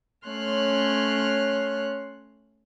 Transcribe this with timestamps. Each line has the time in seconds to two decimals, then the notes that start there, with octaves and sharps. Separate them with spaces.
0.27 A3 C#4 C#5 C6 F6 F#6